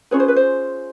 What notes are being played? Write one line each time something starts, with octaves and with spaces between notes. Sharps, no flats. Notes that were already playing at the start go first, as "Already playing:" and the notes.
C#4 F4 G#4 B4 C#5
C5
B4
C5